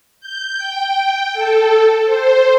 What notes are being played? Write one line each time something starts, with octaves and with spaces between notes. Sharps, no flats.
G6
G5
A4
C5